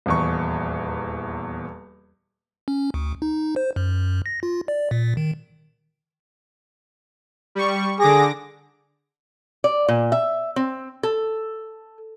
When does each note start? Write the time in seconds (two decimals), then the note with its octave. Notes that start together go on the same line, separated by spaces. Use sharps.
0.06 D#1 E2 C#6
2.68 C#4
2.94 D2
3.22 D#4
3.56 C5
3.76 F#2
4.26 A#6
4.43 F4
4.68 D5
4.91 A#2
5.17 D#3
7.55 G3 C#6
8.00 D3 G#4 D6 A#6
9.64 D5
9.88 A#2
10.12 E5
10.56 C4
11.03 A4